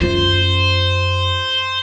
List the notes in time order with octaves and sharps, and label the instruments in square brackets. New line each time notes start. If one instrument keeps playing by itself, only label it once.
[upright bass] F#2 F4 [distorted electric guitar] C5